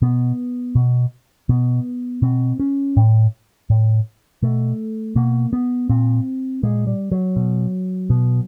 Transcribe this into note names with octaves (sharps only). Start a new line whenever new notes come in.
B2 B3
B2
B2 B3
B2 C4
C#4
A2
A2
B2 A3
B2 A#3
B3
A#2 C4
A#2 G#3
G3
F#3
B2
B2